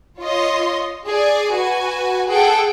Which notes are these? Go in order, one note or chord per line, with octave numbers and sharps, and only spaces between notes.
F4 C#5 D#5 C6
G#4 D5 G#5
F#4 B4 G#5
G#4 A4 F#5 G5